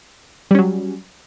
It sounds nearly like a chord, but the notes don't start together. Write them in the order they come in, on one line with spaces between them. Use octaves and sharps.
G3 C#4 F#3